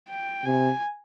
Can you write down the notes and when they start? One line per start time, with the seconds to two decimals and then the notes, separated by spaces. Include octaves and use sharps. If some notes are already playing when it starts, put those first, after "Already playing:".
0.09 G5
0.45 C3 G#5